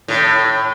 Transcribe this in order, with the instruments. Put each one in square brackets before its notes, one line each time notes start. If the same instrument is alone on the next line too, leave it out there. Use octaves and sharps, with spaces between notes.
[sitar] A2